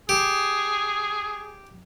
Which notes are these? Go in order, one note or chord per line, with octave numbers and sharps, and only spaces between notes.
G4 G#4